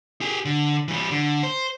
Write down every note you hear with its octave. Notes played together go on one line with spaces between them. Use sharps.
G4 G#4
D3
E3 G3
D3
C5